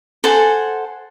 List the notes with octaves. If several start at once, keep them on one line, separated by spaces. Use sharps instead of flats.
A4 C5 F#5 G#5